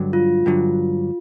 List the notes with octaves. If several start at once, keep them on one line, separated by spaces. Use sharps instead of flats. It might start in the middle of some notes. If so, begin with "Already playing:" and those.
Already playing: G2 D3 F#3
F4
G2 D3 F#3